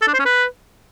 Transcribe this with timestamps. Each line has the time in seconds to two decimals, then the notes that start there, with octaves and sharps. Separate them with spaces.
0.02 A4
0.08 D4
0.14 C5
0.19 C#4
0.25 B4